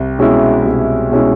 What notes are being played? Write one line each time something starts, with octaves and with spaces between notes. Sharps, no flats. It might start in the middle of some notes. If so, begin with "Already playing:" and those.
Already playing: C2
B2 G#3 C#4 E4
C2
B2 G#3 C#4 E4